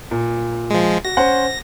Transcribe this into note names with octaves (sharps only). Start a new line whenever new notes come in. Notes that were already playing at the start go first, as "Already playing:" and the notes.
A#2
F3 G#3
F#4 A#6
C#4 C5 F#5